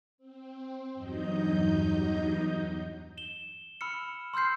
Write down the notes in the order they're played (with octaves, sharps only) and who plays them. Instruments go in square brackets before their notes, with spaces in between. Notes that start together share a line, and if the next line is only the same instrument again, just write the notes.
[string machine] C4
E2 G2 F#3 D#4 D#5 G6
[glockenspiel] E7 G7
B5 E6 F6 C#7
C6 E6 F6 G6 C7